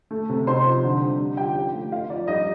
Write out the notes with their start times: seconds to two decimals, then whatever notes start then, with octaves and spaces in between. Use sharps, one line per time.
0.11 A3
0.29 C3
0.47 D#4 C5 C6
0.65 F3
0.83 D3
1.02 G3
1.19 D#4
1.37 F3 G4 G5
1.56 F4
1.73 A3
1.91 D#4 F4 F5
2.10 F3 D5
2.27 G3 D#4 D#5